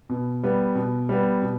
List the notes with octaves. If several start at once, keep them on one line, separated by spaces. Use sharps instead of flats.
B2
G3 B3
B2
G3 B3
B2